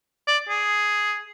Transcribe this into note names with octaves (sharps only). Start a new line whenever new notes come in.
D5
G#4